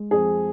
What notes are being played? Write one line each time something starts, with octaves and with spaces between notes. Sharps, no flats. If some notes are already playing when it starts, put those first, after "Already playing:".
Already playing: G#3
F2 G#4